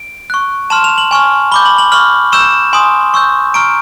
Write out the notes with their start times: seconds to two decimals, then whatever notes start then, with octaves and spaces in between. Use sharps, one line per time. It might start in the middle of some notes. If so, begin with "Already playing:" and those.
Already playing: D7
0.30 C#6 F#6
0.70 A5 C6 F6 E7
0.84 F7
0.98 F#7
1.11 G#5 C#6 F6
1.51 B5 D6 G6 G7
1.65 F#7
1.78 F#7
1.92 C#6 F6 F#7
2.32 C#6 E6 G6 E7
2.73 G#5 C6 D#6
3.14 C#6 E6 G6
3.54 A#5 C#6 F6 D7